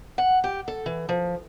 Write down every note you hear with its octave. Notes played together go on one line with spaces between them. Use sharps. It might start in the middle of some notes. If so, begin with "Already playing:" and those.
F#5
G4
A4
E3
F3